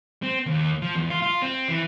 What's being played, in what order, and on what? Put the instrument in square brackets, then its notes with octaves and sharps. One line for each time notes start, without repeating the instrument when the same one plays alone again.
[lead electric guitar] C4
D#2
F3
E2
F4
F4
C4
E3